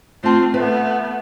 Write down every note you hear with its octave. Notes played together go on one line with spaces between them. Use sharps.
A3 C4 F4 A5
A3 B3 B4